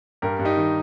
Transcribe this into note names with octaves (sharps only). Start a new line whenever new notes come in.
G2 G4 A#4
G2
D#4 G4
D#3